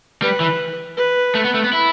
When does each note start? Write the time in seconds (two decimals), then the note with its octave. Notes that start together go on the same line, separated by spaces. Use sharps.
0.22 G3 B4
0.40 E3
0.97 B4
1.35 A3
1.44 B3
1.54 A3
1.64 B3
1.73 E4